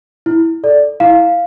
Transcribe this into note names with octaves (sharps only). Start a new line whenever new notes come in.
E4
A4 D5
E4 F5